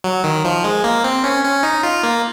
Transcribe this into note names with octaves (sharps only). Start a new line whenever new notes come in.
F#3
D#3
F3
G#3
A#3
C4
C#4
C#4
D#4
F4
A#3